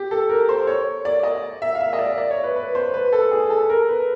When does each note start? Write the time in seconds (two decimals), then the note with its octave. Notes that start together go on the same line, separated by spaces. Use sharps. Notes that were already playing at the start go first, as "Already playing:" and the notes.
Already playing: G4
0.11 A4
0.29 A#4
0.49 C5
0.67 C#5
1.05 D5
1.23 D#5
1.62 E5
1.75 F5
1.80 E5
1.93 D#5
1.99 D5
2.18 D5
2.31 C#5
2.43 B4
2.56 B4
2.75 C5
2.94 B4
3.13 A4
3.31 G#4
3.50 A4
3.69 A#4
3.88 B4